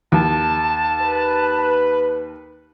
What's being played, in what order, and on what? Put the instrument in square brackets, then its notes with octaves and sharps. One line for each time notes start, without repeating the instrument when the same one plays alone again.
[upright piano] D#2 [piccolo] A5
[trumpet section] B4